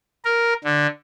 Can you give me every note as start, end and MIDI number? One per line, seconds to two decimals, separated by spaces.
0.25 0.53 70
0.64 0.87 50